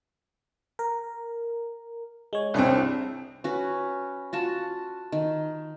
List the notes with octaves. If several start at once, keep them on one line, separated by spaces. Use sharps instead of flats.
A#4
G#3 C#5
C2 C4 D4 G#4 C#5
C#4 F#4 B4
F4 F#4 A5
D#3